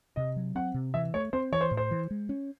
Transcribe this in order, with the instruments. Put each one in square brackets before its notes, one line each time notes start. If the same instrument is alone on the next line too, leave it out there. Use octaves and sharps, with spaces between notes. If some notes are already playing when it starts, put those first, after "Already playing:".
[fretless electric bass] C3 [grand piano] D#5
[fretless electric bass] F#3
[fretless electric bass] C4 [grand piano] F#5
[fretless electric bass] C3
[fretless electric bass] E3 [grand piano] E5
[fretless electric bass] A3 [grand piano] C#5
[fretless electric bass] C4 [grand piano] C5
[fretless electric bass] E3 [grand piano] C#5
[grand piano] C5
[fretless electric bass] A2
[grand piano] C5
[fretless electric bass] E3
G#3
C#4